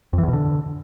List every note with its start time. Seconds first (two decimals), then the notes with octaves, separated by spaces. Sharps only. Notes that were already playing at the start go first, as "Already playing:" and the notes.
0.13 F2
0.18 E3
0.23 E2
0.28 B2
0.33 D3